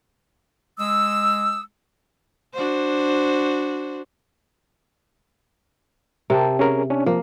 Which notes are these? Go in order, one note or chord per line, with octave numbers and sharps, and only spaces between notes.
G#3 D#6 E6
D4 F#4 C5
C3 A#4 G5 A5
C#4 G#4 A#4
C#4 D4
F3 A#3